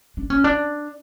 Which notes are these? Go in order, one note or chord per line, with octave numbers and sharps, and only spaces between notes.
D4
C#4
D4